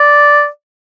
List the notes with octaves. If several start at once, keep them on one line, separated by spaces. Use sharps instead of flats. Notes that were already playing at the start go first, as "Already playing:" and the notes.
Already playing: D5